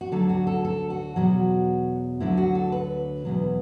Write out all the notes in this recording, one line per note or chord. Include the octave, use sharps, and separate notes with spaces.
F#4
D2 D3 F#3 A4
F#4
A4
A4
F#4
E2 B2 F#3
D2 D3 F#3 E4
F#4
A4
B4
E2 B2 F#3